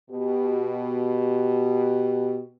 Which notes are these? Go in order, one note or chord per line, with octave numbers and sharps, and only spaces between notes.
B2 G4